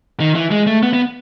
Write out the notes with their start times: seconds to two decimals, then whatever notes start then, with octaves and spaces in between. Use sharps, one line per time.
0.20 D#3
0.35 E3
0.51 G#3
0.67 A3
0.83 B3
0.93 B3